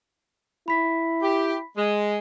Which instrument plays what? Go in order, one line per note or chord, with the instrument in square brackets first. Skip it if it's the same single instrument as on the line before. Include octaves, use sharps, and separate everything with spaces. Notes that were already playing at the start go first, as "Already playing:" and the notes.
[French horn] E4 [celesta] B5 B6
[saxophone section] G4
G#3